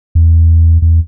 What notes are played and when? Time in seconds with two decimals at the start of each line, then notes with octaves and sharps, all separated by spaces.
0.15 E2
0.82 E2